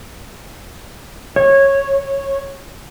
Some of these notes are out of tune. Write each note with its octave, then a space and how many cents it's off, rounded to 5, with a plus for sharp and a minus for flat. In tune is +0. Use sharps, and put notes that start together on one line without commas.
C#5 -15